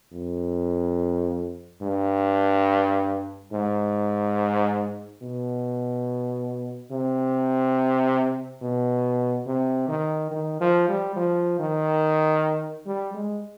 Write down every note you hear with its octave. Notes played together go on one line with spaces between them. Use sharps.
F2
G2
G#2
B2
C3
B2
C3
D#3
D#3
F3
G3
F3
D#3
G3
G#3